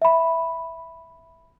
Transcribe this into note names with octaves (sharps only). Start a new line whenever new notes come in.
E5 B5